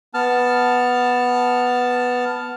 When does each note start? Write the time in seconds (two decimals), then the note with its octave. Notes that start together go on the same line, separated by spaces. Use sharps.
0.14 B3 A5 F6